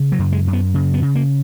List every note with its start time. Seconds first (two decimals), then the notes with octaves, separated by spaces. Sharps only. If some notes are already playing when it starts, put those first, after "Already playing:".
Already playing: C#3
0.12 F#3
0.19 F#2
0.33 G#3
0.47 F#2
0.53 B3
0.74 C#3
0.94 B3
1.02 C#3
1.15 A#3